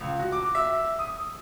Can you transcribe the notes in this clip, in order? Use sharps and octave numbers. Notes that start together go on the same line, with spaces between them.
C#2
F#4
D6
E5
D#6